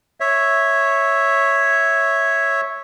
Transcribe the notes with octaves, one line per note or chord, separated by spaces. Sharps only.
C#5 E5